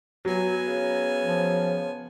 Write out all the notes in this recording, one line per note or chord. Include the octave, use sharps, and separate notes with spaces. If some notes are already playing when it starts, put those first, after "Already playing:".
F#3 B3 G#5
C#3
F3